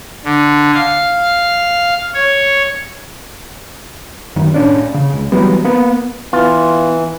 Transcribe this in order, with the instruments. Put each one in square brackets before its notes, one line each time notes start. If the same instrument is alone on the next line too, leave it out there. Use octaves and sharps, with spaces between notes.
[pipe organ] D3
F5
C#5
[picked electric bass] F#2 D#3
A2 C#4 D4
C#3
C#2
E3 F#3 G3 B3
A#3 B3
[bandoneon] E3 [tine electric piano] B3 [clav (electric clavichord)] F4